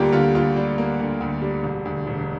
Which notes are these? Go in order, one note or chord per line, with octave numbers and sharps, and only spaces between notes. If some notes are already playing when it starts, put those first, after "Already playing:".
Already playing: D2 D3 G3 A#3 F4 G4
D3 F4
D2 F4
G3
A#3
D3
D2
G3
E1
D2
E1